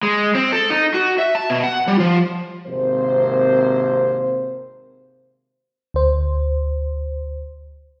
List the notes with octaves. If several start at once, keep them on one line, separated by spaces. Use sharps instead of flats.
G#3
C4
A4
D#4
F#4
E5
A5
B2
F#5
G3
F3
G#1 C3 A#3 C5
D2 C5